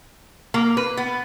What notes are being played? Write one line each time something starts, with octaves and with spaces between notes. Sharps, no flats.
A#3
B4
B3